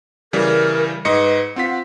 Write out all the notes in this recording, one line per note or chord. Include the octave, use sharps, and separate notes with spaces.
C#3 E3 G3 A#4
G#2 B4 D#5 C#7
C4 F4 F#5 B6